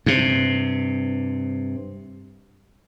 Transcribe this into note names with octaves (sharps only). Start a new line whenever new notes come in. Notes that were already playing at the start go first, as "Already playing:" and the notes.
G2 C3